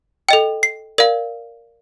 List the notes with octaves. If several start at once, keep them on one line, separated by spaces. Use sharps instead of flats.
A4 D#5 G5
C7
A#4 D5 F5